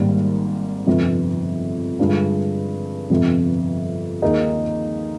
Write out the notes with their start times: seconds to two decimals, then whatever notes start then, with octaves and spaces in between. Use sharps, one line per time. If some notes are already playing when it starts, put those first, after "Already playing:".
Already playing: G#1 G#2 D#3 G3 A#3
0.87 G1 F2 C3
1.99 G2 D3 G#3 D4 F4
3.10 G1 F2 C3
4.22 D#2 D#3 A#3 D#4 G#4